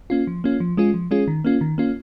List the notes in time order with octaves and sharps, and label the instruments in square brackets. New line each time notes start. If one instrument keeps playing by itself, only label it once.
[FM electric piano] A#3 C#4 F4
F3
A#3 C#4 F4
F3
G#3 C#4 F4 G#4
F3
G#3 C#4 F4 G#4
D#3
A#3 C#4 F4
D#3
A#3 C#4 F4